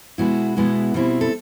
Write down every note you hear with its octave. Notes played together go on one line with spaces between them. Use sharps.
B2 G#3 B3 E4 F#4
B2 G#3 B3 E4
B2 G3 C4 E4
A4